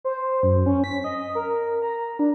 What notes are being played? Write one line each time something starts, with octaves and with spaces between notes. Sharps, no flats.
C5
F#2
C#4
B6
D#5
A#4
A#5
D4